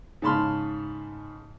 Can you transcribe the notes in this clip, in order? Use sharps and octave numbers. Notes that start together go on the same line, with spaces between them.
G#2 C#3 A5 B5 C6 F6